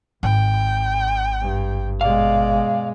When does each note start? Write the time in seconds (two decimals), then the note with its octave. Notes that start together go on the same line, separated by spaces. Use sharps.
0.23 G#1 G5
1.41 G2
2.01 B2 G#3 D5 F5